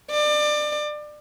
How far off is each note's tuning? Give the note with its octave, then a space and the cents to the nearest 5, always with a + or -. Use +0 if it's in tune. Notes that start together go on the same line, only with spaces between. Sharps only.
D5 +30